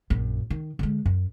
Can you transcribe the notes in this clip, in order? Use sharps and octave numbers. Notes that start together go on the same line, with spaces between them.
A#1 F#2
D#3
D3 G#3
F#2